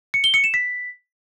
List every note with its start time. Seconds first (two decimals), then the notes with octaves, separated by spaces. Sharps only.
0.14 C#7
0.24 G7
0.34 C#7
0.44 E7
0.54 B6